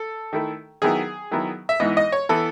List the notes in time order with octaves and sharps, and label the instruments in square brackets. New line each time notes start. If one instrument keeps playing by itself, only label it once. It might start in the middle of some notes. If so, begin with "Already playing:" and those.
Already playing: [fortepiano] A4
D#3 A3 E4
D#3 F#3 B3 E4 G#4
D#3 F#3 B3 E4
E5
G#2 E3 B3 E4 D#5
D#5
C#5
E3 B3 E4 A4